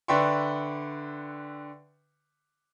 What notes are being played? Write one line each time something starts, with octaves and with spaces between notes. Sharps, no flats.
D3 B4 E5 G5 C6 C#6